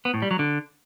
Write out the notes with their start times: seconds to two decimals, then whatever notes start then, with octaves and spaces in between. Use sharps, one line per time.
0.05 B3
0.14 A2
0.22 G3
0.31 F#3
0.39 D3